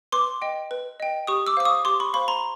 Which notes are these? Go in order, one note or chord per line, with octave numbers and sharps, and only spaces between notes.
B4 C6 D6
D#5 G5
B4
D#5 G5
G4 C#6 D#6
D6 E6
C5 F5 D6
C#6 D#6
G4 C6 D6
B5 C#6
C5 F5 B5 C#6
A#5 C6